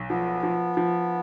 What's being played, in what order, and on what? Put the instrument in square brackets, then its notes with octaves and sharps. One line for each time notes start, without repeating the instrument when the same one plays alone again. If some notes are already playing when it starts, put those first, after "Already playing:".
Already playing: [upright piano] B1
[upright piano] F3 [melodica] B3
[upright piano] F3
F3